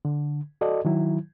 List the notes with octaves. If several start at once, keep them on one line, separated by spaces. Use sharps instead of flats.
D3
F#4 A4 D5 D#5
D#3 F#3 E4